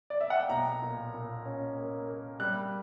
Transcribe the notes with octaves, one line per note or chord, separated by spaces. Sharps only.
D5
E5
F#5
G5
B1 A#5
A#2
A#2
C#4
A#3
A#3
G3 F#6